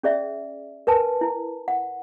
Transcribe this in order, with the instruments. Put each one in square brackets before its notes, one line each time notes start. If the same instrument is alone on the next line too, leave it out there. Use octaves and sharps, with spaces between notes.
[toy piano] C#4 G#4 D5 E5
A#4 B4 G#5 A5
E4
F#5